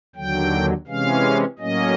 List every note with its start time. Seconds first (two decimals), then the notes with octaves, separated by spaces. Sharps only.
0.16 D#2 D3 F#3 G5
0.87 C3 E3 G#3 C#4 F5
1.59 A2 F#3 A#3 C#4 D#5